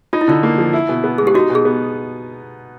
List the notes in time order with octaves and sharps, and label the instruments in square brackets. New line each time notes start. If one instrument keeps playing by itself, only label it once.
[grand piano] D#4 [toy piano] F4
[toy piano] E4
[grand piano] D3 [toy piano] F4
[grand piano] A#3
F3
E4
B2
B3
[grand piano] G#3 [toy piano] G#4
[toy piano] G4
[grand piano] D#4 [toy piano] F#4
[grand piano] B2
[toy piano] G#4
[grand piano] B3